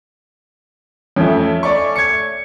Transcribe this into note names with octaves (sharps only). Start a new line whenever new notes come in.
F2 A3 C#4
D5 C#6
G#6 C#7